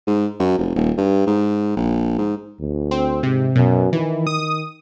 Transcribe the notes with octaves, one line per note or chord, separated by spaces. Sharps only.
G#2
F#2
F1
D#1
G2
G#2
A#1
G#2
D2
C4
G#2 C3
F#2 B2
D#3 E3
D#6